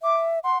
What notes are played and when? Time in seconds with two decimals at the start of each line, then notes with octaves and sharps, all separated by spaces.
0.02 E5 D6
0.44 F#5 C6